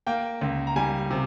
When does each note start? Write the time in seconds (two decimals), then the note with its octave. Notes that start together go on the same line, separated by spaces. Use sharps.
0.07 A#3 G5
0.41 C#2
0.67 A#5
0.76 G3 G#5
1.11 C3